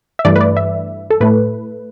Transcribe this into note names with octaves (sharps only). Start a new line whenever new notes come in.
E5
G2 E3 A3 D5
B4
D5
E5
A4
A2 A3 B4